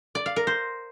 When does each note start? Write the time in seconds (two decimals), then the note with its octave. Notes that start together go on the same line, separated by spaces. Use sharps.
0.15 D5
0.26 F5
0.36 A#4
0.47 C5